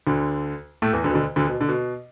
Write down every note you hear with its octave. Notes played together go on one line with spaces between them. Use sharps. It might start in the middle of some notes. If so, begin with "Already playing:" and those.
D2 D3
A2 A3
E2 E3
D2 D3
B2
D2 D3
D2 D3
B2
D3
B2